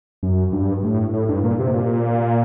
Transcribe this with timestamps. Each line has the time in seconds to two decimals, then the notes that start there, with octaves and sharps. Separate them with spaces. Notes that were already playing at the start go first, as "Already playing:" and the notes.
0.23 F#2
0.53 G2
0.83 A2
1.13 A2
1.29 G2
1.43 A#2
1.59 C3
1.74 A#2